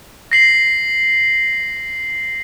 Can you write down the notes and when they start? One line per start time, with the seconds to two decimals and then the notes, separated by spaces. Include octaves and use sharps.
0.32 A#6 C7 F#7